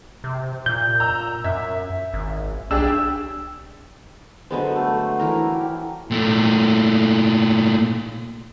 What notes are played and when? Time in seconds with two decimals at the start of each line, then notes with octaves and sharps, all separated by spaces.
0.24 C3
0.66 A#2 G6
1.00 A#5 E6
1.44 F#2 E5
2.14 G#1
2.71 B1 D4 G4 G#4 E6
4.51 D3 F#3 G#3 B3 B4 C5
4.76 A3
5.19 E3 E4 A#4 A#5
5.54 G4
6.11 A#2 A3